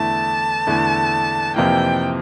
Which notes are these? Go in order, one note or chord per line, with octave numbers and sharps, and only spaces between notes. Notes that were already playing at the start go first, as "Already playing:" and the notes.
Already playing: E2 D3 A3 E4 A5
E2 D3 A3 E4
F2 C3 E3 A#3 F4 G5